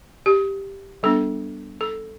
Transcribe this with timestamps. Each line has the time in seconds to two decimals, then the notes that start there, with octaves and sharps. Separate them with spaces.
0.26 G4
1.03 G3 B3 D4 A4
1.81 A4